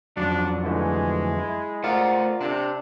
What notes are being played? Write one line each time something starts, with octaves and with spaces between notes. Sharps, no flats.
F2 F#3 D4
D3 E3 G#3 A3
E4
A3 F4 A#4 C5 D5 F#5
C3 D4